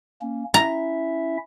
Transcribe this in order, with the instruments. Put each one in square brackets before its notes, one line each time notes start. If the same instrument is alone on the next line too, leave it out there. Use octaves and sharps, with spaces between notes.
[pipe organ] A#3 C#4
[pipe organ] C#4 E4 E5 [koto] A#5